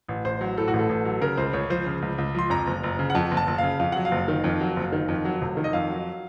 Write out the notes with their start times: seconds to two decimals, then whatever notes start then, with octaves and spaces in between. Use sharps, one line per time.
0.08 A1
0.25 A1 C5
0.41 F#3
0.58 A2 A4
0.68 F#4
0.73 A1
0.79 A4
0.89 A1
1.05 F#3
1.21 C#3 A#4
1.38 C#2 C5
1.53 C#2 C#5
1.70 F3 C5
1.86 C#3
2.02 C#2
2.18 C#2
2.35 F3 C6
2.50 F2 A#5
2.67 F#1
2.83 F#1
2.99 C#3
3.10 F#5
3.15 F2 A5
3.31 F#1
3.37 A5
3.47 F#1
3.58 C#3 F5
3.79 F2 F5
3.92 F#3 F#5
4.05 F5
4.11 F#1
4.28 D#3
4.44 F2
4.61 F#3
4.76 F#1
4.92 D#3
5.08 F2
5.25 F#3
5.41 F1
5.57 D#3
5.64 D#5
5.73 F2 F5
5.89 F#3